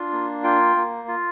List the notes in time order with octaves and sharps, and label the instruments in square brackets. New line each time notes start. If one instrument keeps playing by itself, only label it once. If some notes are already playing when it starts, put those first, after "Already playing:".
Already playing: [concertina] D4 F4
A#3
F4 G5
A#3
F4